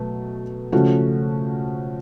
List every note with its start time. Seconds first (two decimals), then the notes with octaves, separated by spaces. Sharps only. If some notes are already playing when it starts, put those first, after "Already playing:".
Already playing: B2 F#3 A3
0.72 C#3 F3 A3 C#4 F#4